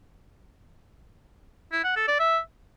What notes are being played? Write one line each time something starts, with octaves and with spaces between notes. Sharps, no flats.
E4
F#5
A4
D5
E5